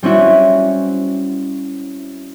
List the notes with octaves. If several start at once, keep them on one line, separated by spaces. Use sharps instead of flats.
G3 C4 C#4 E4 F#4